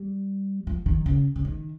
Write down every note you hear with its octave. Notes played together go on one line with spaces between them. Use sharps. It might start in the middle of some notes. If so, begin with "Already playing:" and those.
Already playing: G3
F3
D#3
C#3
C#3
D#3